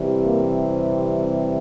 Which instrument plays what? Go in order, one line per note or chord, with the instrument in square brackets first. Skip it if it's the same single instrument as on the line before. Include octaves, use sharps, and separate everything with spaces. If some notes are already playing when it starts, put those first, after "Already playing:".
Already playing: [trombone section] C3 E3 G3
A#3
C4